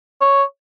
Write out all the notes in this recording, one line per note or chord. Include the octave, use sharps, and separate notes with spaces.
C#5